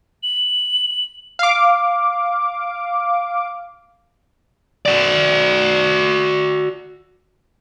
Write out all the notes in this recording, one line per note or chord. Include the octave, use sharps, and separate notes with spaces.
F#7
F5 D6
F#4 D5